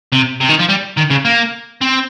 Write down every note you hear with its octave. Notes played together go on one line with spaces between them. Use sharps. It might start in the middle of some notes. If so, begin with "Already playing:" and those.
C3
C3
D#3
F3
G3
D#3
C#3
A#3
C4